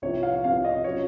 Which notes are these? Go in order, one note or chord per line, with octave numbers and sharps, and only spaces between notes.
C2 C3 F3 C#5
F5
C2 C3 F3 F5
D#5
F#3 C#4 F4 C#5